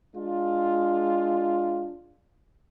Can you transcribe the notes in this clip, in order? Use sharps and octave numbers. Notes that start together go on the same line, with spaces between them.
G#3 D4 F4